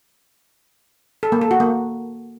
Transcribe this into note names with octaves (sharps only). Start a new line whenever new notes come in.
A4
A#3
A4
F#4
A#3